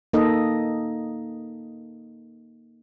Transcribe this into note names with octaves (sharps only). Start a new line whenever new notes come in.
A#3 D#4 A4 D#5